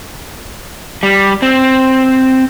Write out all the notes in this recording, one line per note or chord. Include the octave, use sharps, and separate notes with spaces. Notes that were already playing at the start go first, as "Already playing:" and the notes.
G3
C4